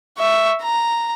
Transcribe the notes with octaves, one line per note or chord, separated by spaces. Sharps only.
E5 C#6
A#5